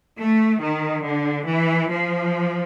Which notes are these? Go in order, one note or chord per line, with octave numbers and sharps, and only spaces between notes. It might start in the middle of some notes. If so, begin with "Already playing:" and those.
A3
D#3
D3
E3
F3